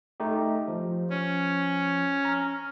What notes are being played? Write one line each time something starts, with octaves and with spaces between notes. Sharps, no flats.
A3 D#4 G4
F3
C#4
A#5 F6